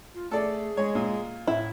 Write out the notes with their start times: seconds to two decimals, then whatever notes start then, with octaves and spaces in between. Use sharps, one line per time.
0.15 F4
0.31 A3 G#4 A4 D5
0.77 G#3 C#5
0.95 A#2
1.47 A2 E4